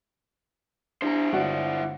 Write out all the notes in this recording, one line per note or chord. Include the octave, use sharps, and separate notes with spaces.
D4 E4 G4 C5 A#5
G1 G#3 F#4 D5 F#5